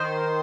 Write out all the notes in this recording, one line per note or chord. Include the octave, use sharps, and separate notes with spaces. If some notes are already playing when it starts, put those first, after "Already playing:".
Already playing: D#3 C5